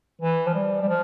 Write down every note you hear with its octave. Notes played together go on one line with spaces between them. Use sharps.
E3
F3
G3
G3
F3